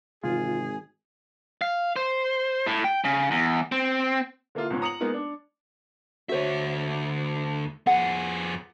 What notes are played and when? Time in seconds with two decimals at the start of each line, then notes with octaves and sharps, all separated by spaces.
0.24 G#1 C3 E3 A3 F4 G#4
1.61 F5
1.96 C5
2.66 A2
2.84 G5
3.04 C#3
3.31 E2
3.72 C4
4.55 D3 A#3 E4 F4
4.70 C#2 G#2 B3 C#4
4.82 A#5 D#6 C#7 F7 F#7
5.00 G#3 A#3 B3 D#4 A#4
5.14 D4
6.29 D2 F#4 C5 C#5 E5
7.87 F2 G#4 F#5